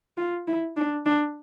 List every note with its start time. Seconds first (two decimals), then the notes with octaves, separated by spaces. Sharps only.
0.17 F4
0.47 E4
0.77 D4
1.06 D4